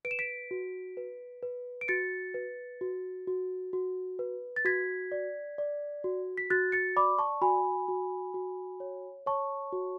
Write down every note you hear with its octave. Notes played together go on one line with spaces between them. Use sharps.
B4 D7
E7
B6 D7
F#4
B4
B4
D7
F#4 A6 C#7
B4
F#4
F#4
F#4
B4
A6
F#4 G#6 B6
D5
D5
F#4
B6
F#4 F#6 A6
A6 C#7
D5 B5 D6
A5 C#6
F#4 G#5 B5
F#4
F#4
C#5
C#5 A5 C#6
F#4